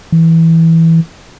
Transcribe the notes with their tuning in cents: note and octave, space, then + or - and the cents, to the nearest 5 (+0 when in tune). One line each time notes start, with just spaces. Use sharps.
E3 -10